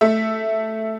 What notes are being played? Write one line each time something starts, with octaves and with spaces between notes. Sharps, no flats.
A3 E5